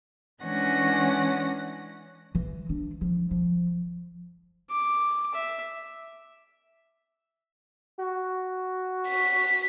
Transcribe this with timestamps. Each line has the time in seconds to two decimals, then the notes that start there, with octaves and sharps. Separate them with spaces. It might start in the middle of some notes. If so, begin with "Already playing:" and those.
0.43 E3 G#3 C#4 D4 F#5 A#6
2.35 E3
2.69 D4
3.01 F3
3.31 F3
4.71 D6
5.34 E5
8.00 F#4
9.08 B6